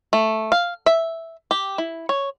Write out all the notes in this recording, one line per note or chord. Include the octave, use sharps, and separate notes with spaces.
A3
F5
E5
G4
E4
C#5